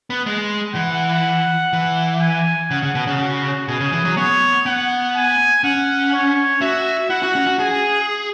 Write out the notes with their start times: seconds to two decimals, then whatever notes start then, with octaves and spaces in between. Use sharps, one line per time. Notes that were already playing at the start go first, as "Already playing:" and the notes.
0.10 B3
0.26 G#3
0.74 E3 F#5
1.73 E3
2.21 G#5
2.70 C#3 F#5
2.82 C#3
2.95 B2
3.07 C#3
3.20 F#4
3.68 B2 G#4
3.80 C#3
3.92 E3
4.05 F#3
4.17 B3 C#5
4.66 B3 F#5
5.15 G#5
5.64 C#4 F#5
6.13 C#5
6.61 F#4 E5
7.10 E4 F#5
7.23 F#4
7.35 C#4
7.47 F#4
7.59 G#4 G#5